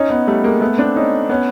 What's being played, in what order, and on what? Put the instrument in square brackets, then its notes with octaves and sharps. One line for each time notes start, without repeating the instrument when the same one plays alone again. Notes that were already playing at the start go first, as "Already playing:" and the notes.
Already playing: [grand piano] C#4 D#4
B3 C#4
G3 A3
G#3 A#3
A3 B3
C4 D4
C#4 D#4
B3 C#4